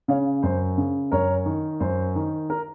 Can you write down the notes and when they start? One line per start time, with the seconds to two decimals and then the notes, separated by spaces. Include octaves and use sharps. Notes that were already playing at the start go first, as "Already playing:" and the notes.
0.08 C#3 C#5 F5
0.43 F#2 C5
0.78 C#3
1.12 F#2 A#4 C#5
1.46 D#3
1.80 F#2 C5
2.15 D#3
2.50 A#4